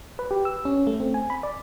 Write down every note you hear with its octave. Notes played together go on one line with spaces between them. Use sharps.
B4
G4
E6
C#4
A3
C4
G#5
B5
D5